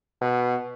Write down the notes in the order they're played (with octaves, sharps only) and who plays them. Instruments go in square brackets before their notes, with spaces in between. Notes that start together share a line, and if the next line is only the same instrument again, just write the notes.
[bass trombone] B2